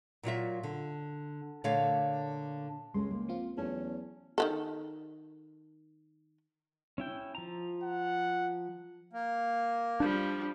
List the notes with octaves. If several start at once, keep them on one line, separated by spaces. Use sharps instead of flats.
A#2 F#3 F4 E5
D3
A#2 D3 A3 C#5 F5
C#2 G#3 A3 C#4 C6
A#3
F3 C4 F4
E2 F#3 A3 C#4 A5
D#3 F#3 A4
C#4 E4 G5
F3 A#5
F#5
A#3
F3 G3 D4